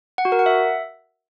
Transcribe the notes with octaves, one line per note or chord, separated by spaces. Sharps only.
F#5
F#4
A#4
F#5
E5